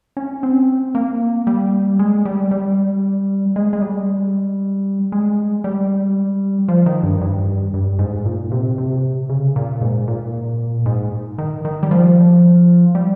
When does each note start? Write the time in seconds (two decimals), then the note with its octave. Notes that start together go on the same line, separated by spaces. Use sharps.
0.17 C#4
0.43 C4
0.95 A#3
1.47 G3
1.99 G#3
2.25 G3
2.51 G3
3.56 G#3
3.73 G#3
3.82 G3
5.12 G#3
5.64 G3
6.68 F3
6.86 D#3
7.03 G2
7.21 G2
7.74 G2
7.99 G#2
8.26 A#2
8.52 C3
8.78 C3
9.29 C#3
9.56 A#2
9.81 G#2
10.08 A#2
10.86 G#2
11.38 D#3
11.65 D#3
11.83 G3
11.91 F3
12.95 G3